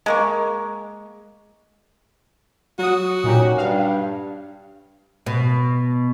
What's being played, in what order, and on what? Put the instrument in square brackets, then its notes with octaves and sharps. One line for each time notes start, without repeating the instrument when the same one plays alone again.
[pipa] G#3 A#3 C#6
[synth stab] F#3 D#6 [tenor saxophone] F#4
[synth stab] A#2 D#4 G4 [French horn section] C#4
[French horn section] G2 [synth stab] F5
[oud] B2